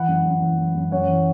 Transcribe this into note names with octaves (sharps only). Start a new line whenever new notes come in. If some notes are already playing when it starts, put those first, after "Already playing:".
Already playing: E3 F#5 B5
F#2
F#2
E3
E3
F#2
F#2 C#5 F#5
E3